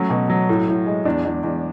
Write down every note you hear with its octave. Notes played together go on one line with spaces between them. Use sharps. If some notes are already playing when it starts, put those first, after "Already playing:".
Already playing: F#3 A3 C#4
B2
F#3
A2
A2
G#3
E2 D4
E2
E2